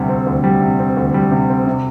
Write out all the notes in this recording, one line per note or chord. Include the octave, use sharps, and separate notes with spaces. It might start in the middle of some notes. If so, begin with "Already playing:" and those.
Already playing: D2 C3 G3
C4
D2
G3
C3
C4
D2
G3
C3
C4
C3